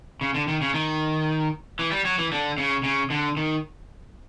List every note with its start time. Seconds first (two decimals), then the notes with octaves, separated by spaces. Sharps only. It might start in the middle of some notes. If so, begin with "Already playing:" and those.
0.21 C#3
0.34 D3
0.48 D#3
0.61 C#3
0.74 D#3
1.79 E3
1.92 G3
2.05 F#3
2.18 E3
2.32 D3
2.58 C#3
2.83 C#3
3.10 D3
3.37 D#3